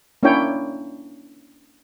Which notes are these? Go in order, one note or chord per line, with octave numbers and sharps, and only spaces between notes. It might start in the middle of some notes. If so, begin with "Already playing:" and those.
A#3 C#4 D4 E4 C#5 G5